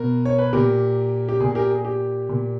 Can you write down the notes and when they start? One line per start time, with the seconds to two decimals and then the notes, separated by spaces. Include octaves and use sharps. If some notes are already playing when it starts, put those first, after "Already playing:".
Already playing: B2 A#4
0.25 C#5
0.38 B4
0.53 A#2 G4 A#4
1.29 G4
1.40 A#2 G#4
1.51 G#4
1.55 G4 A#4
1.70 G#4
1.85 G4
2.29 A#2